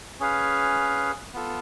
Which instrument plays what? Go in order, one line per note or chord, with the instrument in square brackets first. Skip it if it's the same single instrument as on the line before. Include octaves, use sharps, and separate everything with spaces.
[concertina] C#4 G#4 B4 F5
B3 F4 A4